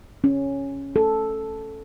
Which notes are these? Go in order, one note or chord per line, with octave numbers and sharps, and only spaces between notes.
C#4
A4